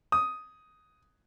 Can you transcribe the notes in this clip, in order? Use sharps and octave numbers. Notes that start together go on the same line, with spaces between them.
D#6